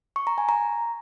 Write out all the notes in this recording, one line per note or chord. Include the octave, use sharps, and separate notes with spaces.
C#6
A#5
G#5
A#5